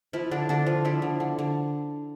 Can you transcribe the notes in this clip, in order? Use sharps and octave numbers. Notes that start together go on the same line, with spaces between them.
F3 E4
D3 D4
D3 D4
F3
D3 E4
D3
D3
D3